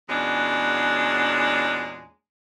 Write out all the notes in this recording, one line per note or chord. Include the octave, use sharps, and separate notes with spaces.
E2 A#2 F#3 G#3 C#4 D4